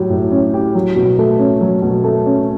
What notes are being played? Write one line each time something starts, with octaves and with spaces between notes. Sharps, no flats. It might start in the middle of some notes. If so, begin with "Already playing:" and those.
Already playing: A2 F#3 G4
A2
C#4
G4
F#3
B2
A3
C#4
F#3
B2
A3
C#4